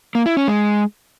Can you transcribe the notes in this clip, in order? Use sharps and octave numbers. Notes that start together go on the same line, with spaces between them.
A#3
E4
C#4
G#3